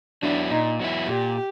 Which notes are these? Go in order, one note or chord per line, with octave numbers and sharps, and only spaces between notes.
F#3 B3 D4 E4
A#2 D#4
F#3 B3 E4
A#2 G4